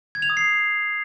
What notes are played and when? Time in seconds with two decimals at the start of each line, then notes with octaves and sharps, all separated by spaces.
0.15 G#6
0.22 F7
0.30 D#6
0.37 C7